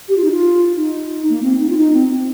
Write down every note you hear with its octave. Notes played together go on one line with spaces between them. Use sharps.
G4
F4
D#4
F4
D#4
A#3
C4
D#4
F4
D#4
C4
C4